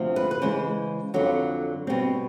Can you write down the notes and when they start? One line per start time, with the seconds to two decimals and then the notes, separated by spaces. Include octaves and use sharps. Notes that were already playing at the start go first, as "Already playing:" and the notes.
Already playing: D2 C3 F3
0.16 B4
0.31 B4
0.42 C#3 E3 G#3 C5
1.14 F2 D3 F#3
1.87 B2 G3 C4